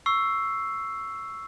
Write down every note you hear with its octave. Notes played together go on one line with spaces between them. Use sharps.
C#6 E6 C7